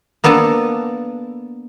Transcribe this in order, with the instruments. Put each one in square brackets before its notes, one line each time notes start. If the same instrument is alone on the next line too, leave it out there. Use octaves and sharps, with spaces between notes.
[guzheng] A#3 B3 D4 A4 A5